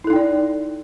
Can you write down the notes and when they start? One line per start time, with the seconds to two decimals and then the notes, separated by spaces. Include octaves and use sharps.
0.04 E4
0.07 A4
0.10 D#4
0.13 G5
0.16 D5